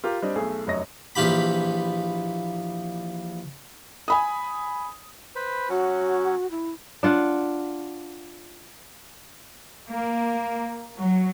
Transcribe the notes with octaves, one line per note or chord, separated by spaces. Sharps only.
F4 G4 A#4
G3 C4 D4 D#5
B1 A3 G#4
F1 F#2 C#5 D#5 A#6
A#1 E3 F4 G4 B5
G#5 B5 D#6
B4 C5 B5
F#3 C#4 F#4
E4
D4 F4 F#5
A#3
F#3